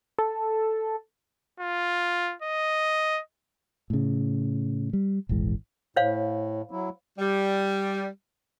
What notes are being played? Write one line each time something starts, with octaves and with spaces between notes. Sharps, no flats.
A4
F4
D#5
A2 C#3
G3
D#1 G#1 E3 G#3
A2 C5 C#5 F5
F#3 E4
G3